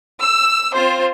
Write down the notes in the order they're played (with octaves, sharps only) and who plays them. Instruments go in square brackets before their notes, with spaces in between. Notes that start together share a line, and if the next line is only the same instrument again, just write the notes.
[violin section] E6
C4 F4 C5